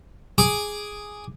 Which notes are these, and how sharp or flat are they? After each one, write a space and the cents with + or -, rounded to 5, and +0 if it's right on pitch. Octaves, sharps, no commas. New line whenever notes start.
G#4 +0 D6 +0